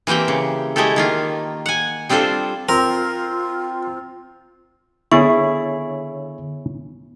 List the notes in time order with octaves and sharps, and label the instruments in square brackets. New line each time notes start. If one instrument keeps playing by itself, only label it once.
[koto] E3 A#3 C4 G4 G5
C#3
G#3 A3 E4 G4 A4
D#3 A#3 F4
F#5 G#5
G3 C4 D4 F4 A4 C5
[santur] C4 [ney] F4 [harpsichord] A#4
[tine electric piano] D3 C#5 [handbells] B3 C#6 [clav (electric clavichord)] E4 G#4